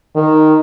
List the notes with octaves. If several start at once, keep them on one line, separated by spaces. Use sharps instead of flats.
D#3